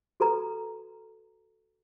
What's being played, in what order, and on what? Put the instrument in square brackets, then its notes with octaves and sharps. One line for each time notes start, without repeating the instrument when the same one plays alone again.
[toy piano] F#4 A4 B4 A#5